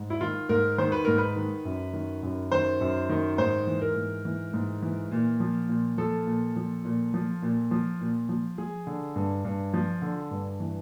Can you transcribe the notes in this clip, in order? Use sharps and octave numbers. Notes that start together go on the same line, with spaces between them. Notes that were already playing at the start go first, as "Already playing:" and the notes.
Already playing: G#2
E4
D#3 F4
G#2 A#4
D#3 C5
B4
G#2 A#4
B4
D#3
F#2
D#3
F#2
D#3 C5
F#2
D#3
G#2 C5
E3
A#4
G#2
E3
G#2
E3
A#2
F3
A#2
F3 A4
A#2
F3
A#2
F3
A#2
F3
A#2
F3
F3 G#4
D3
G2
G2
F3
D3
G2
E3